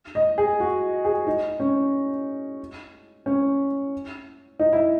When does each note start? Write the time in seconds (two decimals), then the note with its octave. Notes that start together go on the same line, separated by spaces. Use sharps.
0.15 D#5
0.38 G#4
0.60 F#4
1.05 G#4
1.27 D#4
1.60 C#4
3.26 C#4
4.59 D#4
4.73 E4